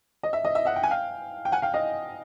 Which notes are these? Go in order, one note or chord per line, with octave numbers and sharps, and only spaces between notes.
D#5
E5
D#5
E5
E5 F#5
G5
G#5
F5 G5
G5
F#5 G#5
F5 G5
D#5 F5